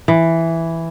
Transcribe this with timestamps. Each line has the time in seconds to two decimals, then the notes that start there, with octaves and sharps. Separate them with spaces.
0.08 E3